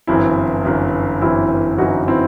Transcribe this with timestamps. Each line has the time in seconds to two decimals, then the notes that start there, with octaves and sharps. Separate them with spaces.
0.07 G1 F#2 E3 C4 E4
0.64 G1 F#2 E3
1.22 G1 F#2 E3 C4 E4
1.78 G1 F#2 E3 D#4 F#4
2.08 C4 E4